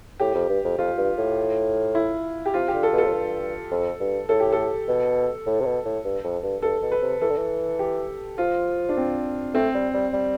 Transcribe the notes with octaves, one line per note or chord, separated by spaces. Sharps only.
A2 G4
F2
G2
F2
F2 F4
G2
A2
E4
G4
C3 F4
G4
D3
A4
B2
A4
F2
G2
F2
G2
A2 A4
G4
A4
B2
A2
C3
B2
A2
G2
F2
G2
G2 A4
B2
B4
C3
E3 A4
D3
E3
G4
F3 F4
D4
C4
A3 C4
G3
G3
G3